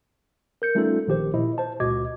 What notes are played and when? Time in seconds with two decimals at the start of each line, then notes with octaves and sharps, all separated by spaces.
0.62 A#4 G6 C#7
0.75 G3 A3 C#4 D#4 F4 A4
1.07 A#1 D#3 G4 C5
1.33 A#2 E4 D#5
1.58 C5 A5
1.80 C#2 A#2 F#4 D#5 D6 G#6